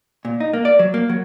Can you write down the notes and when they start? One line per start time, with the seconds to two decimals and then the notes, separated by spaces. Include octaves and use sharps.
0.25 A#2
0.40 D#4
0.53 A#3
0.65 D5
0.79 F#3
0.94 A#3
1.09 F#3